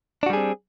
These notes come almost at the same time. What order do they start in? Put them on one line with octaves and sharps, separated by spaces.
D4 F#4 G3 G#4 C4